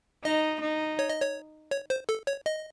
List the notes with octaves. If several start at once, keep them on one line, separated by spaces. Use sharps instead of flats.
D#4 D#5
D#4
C#5
D#5
C#5
C#5
C5
A4
C#5
D#5